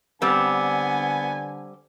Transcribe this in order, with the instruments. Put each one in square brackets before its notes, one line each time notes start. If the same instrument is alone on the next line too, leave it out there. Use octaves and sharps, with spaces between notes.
[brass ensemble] D3 [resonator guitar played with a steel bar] G3 C4 [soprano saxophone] B3 [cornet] G#5